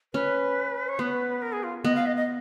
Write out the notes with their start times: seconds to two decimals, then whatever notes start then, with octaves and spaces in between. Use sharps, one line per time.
0.14 C#4 B4
0.89 C#5
0.99 B3 B4
1.42 A#4
1.53 G#4
1.63 F4
1.84 B3 D#5
1.95 F5
2.06 D#5
2.16 D#5